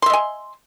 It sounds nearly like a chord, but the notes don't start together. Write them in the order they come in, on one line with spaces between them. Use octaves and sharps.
C6 E5 D#5 G#5